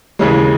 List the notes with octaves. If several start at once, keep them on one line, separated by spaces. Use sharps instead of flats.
D#2 C#3 E3 G#3 C#4